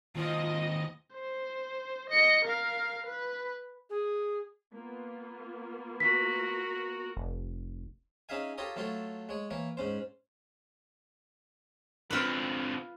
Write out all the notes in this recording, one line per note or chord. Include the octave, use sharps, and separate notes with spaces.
D#2 C4 F4 D#5
C5
D#5 C#7
A#4 F5
B4
G#4
A#3 B3 F4
F#4 A#4 B6
F1
C#4 D#4 G#4 E5 F5 G#5
F4 G4 A4 C#5 A#5 D#6
F#3 A3 F4 A4 C#5
G#3 C#5
E3 A#3 C#5
G#2 C#4 C5
D3 C4 F4 B4